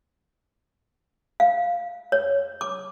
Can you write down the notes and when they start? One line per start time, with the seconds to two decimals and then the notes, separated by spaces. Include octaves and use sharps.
1.40 F5
2.12 C#5
2.61 D6